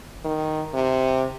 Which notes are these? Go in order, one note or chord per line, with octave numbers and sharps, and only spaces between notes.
D#3
C3